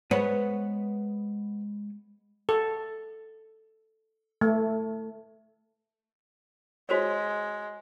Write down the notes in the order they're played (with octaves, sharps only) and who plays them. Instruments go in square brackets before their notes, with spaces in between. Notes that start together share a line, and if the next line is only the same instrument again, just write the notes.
[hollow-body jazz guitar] G#3 C5 C#5 [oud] B3
[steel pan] A4
A3
[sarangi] G#3 [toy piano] F#4 C5 C#5